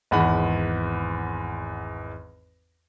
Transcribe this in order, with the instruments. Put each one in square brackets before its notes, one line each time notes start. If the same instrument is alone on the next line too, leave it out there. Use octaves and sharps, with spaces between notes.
[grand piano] G#1 E2 F#5 B5